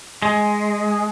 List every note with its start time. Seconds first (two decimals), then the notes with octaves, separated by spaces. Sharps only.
0.22 G#3